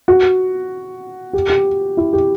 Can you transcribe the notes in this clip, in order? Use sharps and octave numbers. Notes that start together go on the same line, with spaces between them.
F#4
G4
G4
E4
G4